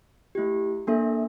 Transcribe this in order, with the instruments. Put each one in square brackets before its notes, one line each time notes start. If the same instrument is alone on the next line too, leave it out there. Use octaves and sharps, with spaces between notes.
[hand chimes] A3 E4 G4
A#3 D4 A4 E5